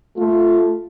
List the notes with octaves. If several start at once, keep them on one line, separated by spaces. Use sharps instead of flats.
A3 F4